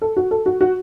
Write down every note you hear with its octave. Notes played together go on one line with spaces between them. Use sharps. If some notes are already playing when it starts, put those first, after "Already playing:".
A4
F#4
A4
F#4
F#4